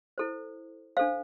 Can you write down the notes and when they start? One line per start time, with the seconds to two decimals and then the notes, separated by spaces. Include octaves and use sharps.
0.18 E4 A4 C5
0.97 D4 A4 C5 F5